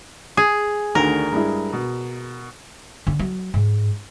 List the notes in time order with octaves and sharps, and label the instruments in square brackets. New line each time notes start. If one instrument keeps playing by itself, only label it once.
[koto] G#4
[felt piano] D2 D3 D#3 [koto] A#4
[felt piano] G2 G#3 E4
B2
[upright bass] D3
F#3
G#2